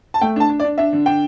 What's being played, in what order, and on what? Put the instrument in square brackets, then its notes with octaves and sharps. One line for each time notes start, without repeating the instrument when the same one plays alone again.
[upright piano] A5
A3 G5
D4 A5
D4
D5
D4
D4 E5
D3
D4 G5